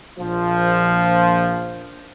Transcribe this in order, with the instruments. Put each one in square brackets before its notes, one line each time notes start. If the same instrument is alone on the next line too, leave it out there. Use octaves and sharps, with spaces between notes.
[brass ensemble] A#1 F3